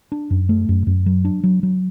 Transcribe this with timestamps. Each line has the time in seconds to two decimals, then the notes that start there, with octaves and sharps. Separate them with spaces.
0.12 D4
0.30 F#2
0.49 A3
0.69 F#2
0.87 F#2
1.06 F#3
1.25 D4
1.44 F#3
1.63 F#3